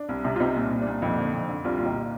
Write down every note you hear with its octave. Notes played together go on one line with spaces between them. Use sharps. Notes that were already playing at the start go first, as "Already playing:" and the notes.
Already playing: D4
C2
C3
F4
C2 C4 D#4
A#2
C2
A#2 D4
F2 C4 D#4
D3
F2
D3
C2 D4 F4
A#2 F4
D#4 G4